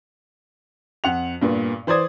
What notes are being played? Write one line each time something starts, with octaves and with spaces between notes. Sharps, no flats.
F2 F#5 F7
G2 A#2 B3
E3 C5 D5 D#6 G#6